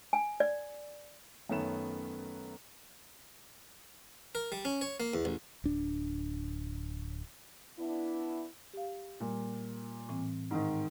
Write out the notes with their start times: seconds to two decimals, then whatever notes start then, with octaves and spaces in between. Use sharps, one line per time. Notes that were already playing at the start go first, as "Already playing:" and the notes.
0.13 G#5
0.40 D5
1.49 F#2 D#3 A3 B3 C#4 E7
4.35 A#4
4.52 G3
4.65 C#4
4.81 C#5
5.00 A#3
5.14 E2
5.25 A1
5.64 D1 D4
7.78 B3 D4 E4
8.74 G4 F5
9.20 A#2 G3
10.09 A2 E3 C4
10.51 G#2 D#3